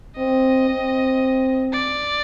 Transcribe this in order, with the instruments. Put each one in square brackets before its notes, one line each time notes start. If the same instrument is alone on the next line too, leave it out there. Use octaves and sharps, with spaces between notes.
[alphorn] C4 [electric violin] D#5
[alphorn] C4
[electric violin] D5